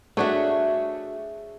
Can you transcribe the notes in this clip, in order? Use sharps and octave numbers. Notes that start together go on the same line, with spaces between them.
A3 D4 F#4 G#4 C#5 E5